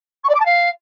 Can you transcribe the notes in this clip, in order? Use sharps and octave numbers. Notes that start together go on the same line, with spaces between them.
C#6
D5
D6
A5
F5